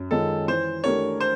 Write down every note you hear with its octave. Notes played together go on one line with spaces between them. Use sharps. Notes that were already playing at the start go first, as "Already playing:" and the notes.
Already playing: F#2
D#3 G#3 C#4 F4 A4
E3 C5
A3 D4 G4 A#4 C#5
C5